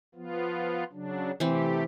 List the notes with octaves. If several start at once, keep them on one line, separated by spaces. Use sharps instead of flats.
F3 B3 F4
C#3 F#3 D4
C3 E3 A3 C4 G4